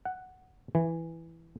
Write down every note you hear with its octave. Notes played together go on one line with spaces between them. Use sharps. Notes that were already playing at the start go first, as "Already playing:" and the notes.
F#5
E3